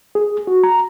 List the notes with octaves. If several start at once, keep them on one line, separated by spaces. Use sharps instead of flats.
G#4
F#4
A#5